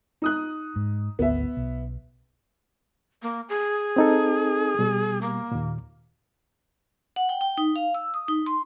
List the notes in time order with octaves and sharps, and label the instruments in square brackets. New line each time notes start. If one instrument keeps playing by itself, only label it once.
[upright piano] D#4 D#6 F#6
[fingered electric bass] G#2
[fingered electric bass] G#1 D2 [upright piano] B3 E5
[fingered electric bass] B1
[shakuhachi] A#3
G#4
[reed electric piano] C4 D#4 A4
B2 G3
[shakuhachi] A#3
[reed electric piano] D#2 A#2
[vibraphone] F#5
G5
G5
D#4
F5
E6
D#6
D#4
C6